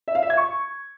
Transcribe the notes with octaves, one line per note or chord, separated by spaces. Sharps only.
E5
F5
E5
G#6
C#6